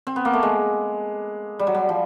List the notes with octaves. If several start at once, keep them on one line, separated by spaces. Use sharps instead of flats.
C4
B3
A#3
A3
G#3
G3
F#3
G3
F3